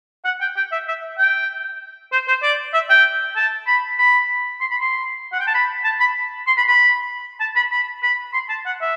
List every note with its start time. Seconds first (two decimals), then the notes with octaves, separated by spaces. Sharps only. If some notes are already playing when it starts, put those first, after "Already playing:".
0.25 F#5
0.41 G5
0.57 G5
0.72 E5
0.88 E5
1.18 G5
2.12 C5
2.28 C5
2.42 D5
2.74 E5
2.90 G5
3.36 A5
3.67 B5
3.99 B5
4.60 C6
4.71 B5
4.81 C6
5.32 F#5
5.40 G5
5.47 A5
5.54 B5
5.85 A5
6.00 B5
6.47 C6
6.57 B5
6.68 B5
7.40 A5
7.56 B5
7.72 B5
8.03 B5
8.33 C6
8.49 A5
8.66 F#5
8.81 E5